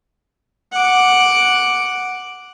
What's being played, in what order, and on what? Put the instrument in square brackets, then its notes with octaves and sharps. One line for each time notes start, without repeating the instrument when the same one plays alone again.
[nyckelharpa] F#5 D6